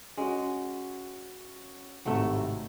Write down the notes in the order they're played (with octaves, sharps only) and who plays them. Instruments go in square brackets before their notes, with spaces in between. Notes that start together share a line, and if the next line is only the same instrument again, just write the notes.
[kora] G#3 [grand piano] C#4 F#4
[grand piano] G#1 A2 C3 [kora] F#3 A3